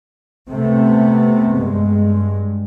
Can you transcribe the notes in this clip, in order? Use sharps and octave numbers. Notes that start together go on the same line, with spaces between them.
C3 A3 B3
G2 G#3